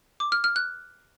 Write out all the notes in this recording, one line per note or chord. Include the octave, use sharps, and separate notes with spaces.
D6
F6
F6
F#6